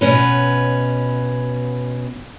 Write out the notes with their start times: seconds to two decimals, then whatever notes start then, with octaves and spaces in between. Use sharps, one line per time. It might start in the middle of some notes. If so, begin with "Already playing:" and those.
0.01 B2 C#4 B4